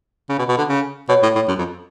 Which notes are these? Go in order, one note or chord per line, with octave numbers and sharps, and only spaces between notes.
C#3
B2
B2
D3
C#3
B2 C#5
A2
A2
F#2
F2